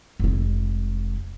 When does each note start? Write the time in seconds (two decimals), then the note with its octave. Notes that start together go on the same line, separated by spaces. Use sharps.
0.20 F1 G#3